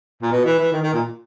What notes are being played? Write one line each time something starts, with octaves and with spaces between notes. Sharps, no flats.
A#2
B2
E3
E3
D#3
D#3
A#2